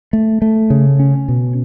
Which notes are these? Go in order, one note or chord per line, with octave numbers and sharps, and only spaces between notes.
A3
A3
C#3
C#4
B2